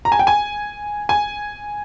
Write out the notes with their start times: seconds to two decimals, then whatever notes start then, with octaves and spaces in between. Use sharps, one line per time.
0.05 A#5
0.12 G#5
0.19 G5
0.27 G#5
1.09 G#5